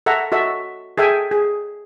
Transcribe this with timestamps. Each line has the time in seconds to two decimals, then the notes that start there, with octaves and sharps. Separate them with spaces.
0.06 A4 E5 F#5 A#5
0.32 F#4 A4 D#5 E5
0.98 G#4 A4 E5 G5 G#5
1.31 G#4